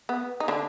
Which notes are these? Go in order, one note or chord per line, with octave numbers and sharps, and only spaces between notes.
B3
D#4
D3 D4